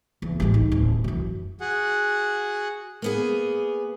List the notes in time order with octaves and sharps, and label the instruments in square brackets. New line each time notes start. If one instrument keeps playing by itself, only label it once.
[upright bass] E2
A1 G#3
D#4
D1
F#2 E3
[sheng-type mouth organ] F#4 G#4 F#5
[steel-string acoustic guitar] A#3 B3 G#4